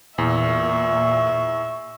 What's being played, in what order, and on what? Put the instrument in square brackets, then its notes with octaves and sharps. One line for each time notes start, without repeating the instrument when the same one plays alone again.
[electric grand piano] E2 [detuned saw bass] A#2 [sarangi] E5 [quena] C#6